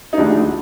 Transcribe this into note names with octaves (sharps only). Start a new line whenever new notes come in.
D#4
D2 D3 F3 G#3 D4